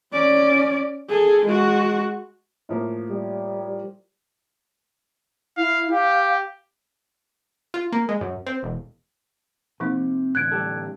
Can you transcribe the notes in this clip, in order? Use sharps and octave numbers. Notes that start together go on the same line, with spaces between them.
C#4 D5
G#4 A4
G#3 F#4
A2 F3 A#3
G3
E4 F5
G4 F5
F4
A#3
G#3
F#2
C4
E1
C3 F3 A#3 D#4
A2 D3 E3 F#6 G#6 D7
G3 G4 A4